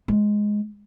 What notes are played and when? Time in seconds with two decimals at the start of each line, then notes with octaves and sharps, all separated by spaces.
0.08 G#3